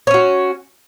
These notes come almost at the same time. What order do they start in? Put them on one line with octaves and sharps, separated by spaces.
C#5 C#4 F#4